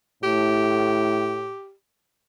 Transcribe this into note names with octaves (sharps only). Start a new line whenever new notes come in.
A2 G4